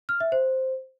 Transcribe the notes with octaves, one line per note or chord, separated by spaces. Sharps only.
F6
E5
C5